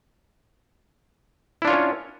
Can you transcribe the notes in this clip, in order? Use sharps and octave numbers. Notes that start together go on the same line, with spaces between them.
C#4 D4 E4 F4 C#5